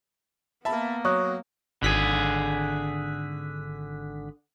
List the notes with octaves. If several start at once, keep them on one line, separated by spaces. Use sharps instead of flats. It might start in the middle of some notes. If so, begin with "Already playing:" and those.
A#3 B3 E5 A5 B5
F#3 C#5 C#6 D#6 F#6
G#1 D3 G#4 B6